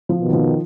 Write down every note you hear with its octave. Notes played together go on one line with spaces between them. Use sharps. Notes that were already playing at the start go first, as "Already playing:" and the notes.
F3
B2 D#3
F3